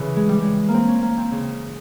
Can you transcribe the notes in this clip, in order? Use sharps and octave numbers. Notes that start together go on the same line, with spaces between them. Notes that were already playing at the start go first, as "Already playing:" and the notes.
Already playing: C#3 E3
G#3
G3
G#3
A#3
C4
C#4
A#3
C4
C#3